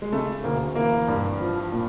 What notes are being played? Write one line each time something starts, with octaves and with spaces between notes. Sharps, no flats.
G#3
C#3 A3
D2 A#3
E3 A#3
G2
F3
A#2